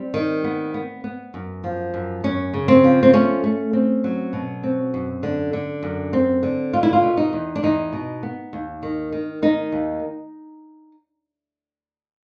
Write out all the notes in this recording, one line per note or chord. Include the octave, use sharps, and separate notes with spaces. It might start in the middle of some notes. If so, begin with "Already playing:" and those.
Already playing: G3 C4
D#3
B3
B3
B3
F#2
F3
F#2
F#2 C#4
C#3
C4
F3
C4
A3 C#4
A3
C4
F#3
B2
C4
F#2
D3
D3
F#2
C4
D3
B2 F4
E4
F4
B2
D#4
E2
D4
E2 D#4
B2
B3
D#2
D#3
D#3
D#3 D#4
D#2